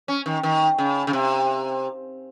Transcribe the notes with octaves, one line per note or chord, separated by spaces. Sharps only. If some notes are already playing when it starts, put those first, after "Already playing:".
C#4
D#3
D#3
C#3
C#3
C3